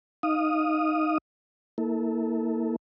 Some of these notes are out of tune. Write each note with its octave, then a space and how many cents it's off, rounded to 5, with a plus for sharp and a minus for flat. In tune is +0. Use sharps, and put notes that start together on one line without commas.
D#4 +0 F5 +0 D#6 -5
A#3 +0 E4 -30 A4 +0